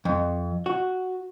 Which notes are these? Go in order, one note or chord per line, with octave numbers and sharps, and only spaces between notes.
F2
F#4